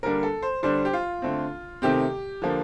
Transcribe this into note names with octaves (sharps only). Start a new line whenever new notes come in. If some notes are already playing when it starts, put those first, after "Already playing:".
D3 G3 A#3 D4 A#4
A4
C5
D3 G3 D4 C5
G4
F4
D3 A3 C4
C3 D#3 A3 C4 G4
D3 F3 A#3